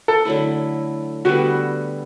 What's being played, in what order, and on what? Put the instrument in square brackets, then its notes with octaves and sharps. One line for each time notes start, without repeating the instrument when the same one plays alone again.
[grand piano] A4
[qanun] D3 F#3 A3 E4
[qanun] D3 G3 B3 [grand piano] F#4